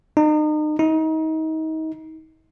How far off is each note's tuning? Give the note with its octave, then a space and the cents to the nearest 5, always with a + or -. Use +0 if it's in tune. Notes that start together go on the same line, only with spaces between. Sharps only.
D#4 -35
D#4 +30